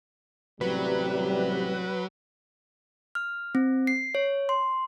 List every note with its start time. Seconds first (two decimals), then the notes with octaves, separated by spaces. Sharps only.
0.61 A1 C3 F#3 G3 B4
3.15 F6
3.55 C4
3.87 C7
4.15 C#5
4.49 C6